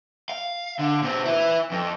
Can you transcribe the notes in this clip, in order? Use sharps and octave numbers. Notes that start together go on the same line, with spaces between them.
F5
D3
A#2 C4
E4 B4
F2